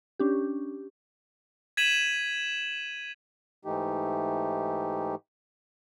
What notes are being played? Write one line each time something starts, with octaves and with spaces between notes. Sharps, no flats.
C#4 D4 G4
G#6 B6 D#7 E7 F#7
G#2 E3 A3 D#4 G4